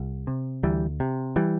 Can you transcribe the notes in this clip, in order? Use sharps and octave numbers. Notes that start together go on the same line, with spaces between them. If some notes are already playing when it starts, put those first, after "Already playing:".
Already playing: C2
C3
D2 E3 G3
C3
E3 G3